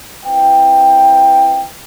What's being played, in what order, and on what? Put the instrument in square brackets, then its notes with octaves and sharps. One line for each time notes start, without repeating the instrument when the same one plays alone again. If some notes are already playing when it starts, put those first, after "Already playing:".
[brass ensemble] C4 E4 B4 G5